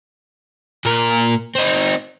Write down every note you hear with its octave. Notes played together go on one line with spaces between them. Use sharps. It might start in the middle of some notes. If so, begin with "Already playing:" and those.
A#2 A#4
C4 D#4